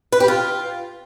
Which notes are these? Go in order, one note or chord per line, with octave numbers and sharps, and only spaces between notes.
B4
G4
F4